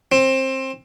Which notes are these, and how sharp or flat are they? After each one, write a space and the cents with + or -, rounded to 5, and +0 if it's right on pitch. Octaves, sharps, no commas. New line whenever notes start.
C4 +20